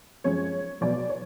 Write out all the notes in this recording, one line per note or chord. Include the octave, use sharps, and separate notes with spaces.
F#2 F3 G#3 C#4 C#5
B1 B2 F#3 B3 D5
C#5